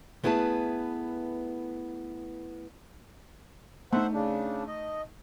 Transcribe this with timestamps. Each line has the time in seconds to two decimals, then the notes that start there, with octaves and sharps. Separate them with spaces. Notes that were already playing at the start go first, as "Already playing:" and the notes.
0.24 A3 B3 E4 G#4 B4 A5
3.92 A3 D#4 C5 E5 F#5
4.13 C#3 D4
4.68 D#5